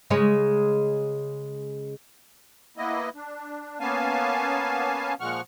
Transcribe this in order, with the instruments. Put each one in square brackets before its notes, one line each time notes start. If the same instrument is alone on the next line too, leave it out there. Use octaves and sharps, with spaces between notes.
[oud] C#3 G#3 C#5
[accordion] A#3 B3 E4 D#5
D4
A#3 B3 C#4 F5 G#5 A5
A#2 F3 G#3 F#5 C#6 F6